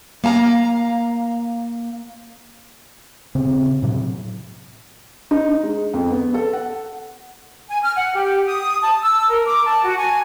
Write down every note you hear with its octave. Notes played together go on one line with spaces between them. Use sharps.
A#3 F5 A5 A#5
D#1 C#3 C4
A2 C3 F#3
D#4
G#3
F2
B3
A4
F#5
G#5
F6
F#5
G4
D#6
A5
E6
A#4
D6
A5
F#4
G#5